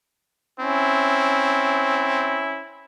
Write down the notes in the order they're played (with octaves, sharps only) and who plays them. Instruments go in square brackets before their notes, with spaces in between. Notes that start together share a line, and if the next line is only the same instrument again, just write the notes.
[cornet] C4 [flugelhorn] C#4 [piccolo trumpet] E4